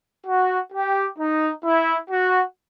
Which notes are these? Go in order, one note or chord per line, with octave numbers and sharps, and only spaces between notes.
F#4
G4
D#4
E4
F#4